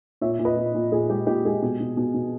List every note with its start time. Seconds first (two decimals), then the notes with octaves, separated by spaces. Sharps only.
0.21 A#2 C#5 E5
0.39 A#2
0.45 B4 D#5
0.57 A#2
0.74 A#2
0.92 A#2 G#4
1.10 G#3 G4
1.27 A#2 G4
1.45 G#3 G#4
1.62 B2
1.80 B2
1.97 B2
2.14 B2